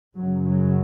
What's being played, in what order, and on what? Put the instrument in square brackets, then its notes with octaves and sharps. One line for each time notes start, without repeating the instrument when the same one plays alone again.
[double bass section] F#2 C#3 F#3
F#3